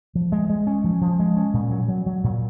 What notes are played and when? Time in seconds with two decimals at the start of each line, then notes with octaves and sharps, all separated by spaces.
0.15 F3
0.32 G#3
0.49 G#3
0.67 C#4
0.84 F3
1.01 F3
1.20 G#3
1.37 C#4
1.54 A#2
1.71 F#3
1.88 F#3
2.06 F#3
2.24 A#2